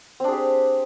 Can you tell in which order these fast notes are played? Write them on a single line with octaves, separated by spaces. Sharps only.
C4 D4 G#4 G4